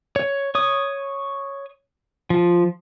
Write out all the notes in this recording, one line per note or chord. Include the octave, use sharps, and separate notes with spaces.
C#5
C#5 D#6
F3